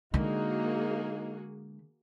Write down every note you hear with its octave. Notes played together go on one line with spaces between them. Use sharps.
D3 G#3 A#3 D#4 F#4 G#4